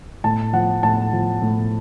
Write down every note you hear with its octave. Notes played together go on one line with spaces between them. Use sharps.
A2 A5
F3 F#5
A2 A5
F3
A2